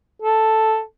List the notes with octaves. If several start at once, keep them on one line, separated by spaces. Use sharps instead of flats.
A4